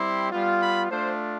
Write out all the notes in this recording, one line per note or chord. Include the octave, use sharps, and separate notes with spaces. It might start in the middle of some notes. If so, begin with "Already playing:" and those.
Already playing: G3 C4 E4 G4 C6
G3 B3 F4
B5
A3 D4 F4 C5